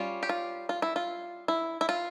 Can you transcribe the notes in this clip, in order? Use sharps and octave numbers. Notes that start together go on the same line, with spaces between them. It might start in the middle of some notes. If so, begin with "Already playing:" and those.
Already playing: G3 C#4 F4
G4
F4
F4
E4
F4
E4
E4
F4